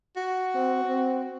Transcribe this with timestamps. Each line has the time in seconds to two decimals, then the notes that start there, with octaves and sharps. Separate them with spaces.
0.16 F#4
0.55 C4
0.84 C4